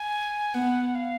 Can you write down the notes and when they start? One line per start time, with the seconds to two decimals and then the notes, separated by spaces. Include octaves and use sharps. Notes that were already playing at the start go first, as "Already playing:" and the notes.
Already playing: G#5
0.54 B3 F#5
0.95 F5